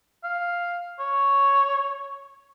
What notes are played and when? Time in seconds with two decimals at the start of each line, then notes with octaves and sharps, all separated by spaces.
0.24 F5
1.00 C#5